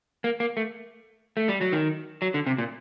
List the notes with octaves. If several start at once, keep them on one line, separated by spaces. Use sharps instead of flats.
A#3
A#3
A3
A3
G3
F#3
D#3
F#3
D3
C3
A#2